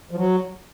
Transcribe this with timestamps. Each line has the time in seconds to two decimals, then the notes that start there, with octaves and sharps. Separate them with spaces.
0.11 F3
0.16 F#3